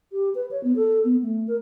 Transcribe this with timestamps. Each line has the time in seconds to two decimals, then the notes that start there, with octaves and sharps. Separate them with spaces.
0.12 G4
0.35 B4
0.51 C#5
0.63 B3
0.76 A4
1.04 B3
1.22 A3
1.47 A#4